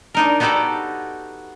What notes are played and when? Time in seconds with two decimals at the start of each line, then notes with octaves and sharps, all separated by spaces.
0.14 D4 D#4 A#4
0.40 B3 D#4 F#4 G4 A4 D5